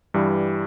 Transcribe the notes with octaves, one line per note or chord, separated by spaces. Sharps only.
G2 E3 G3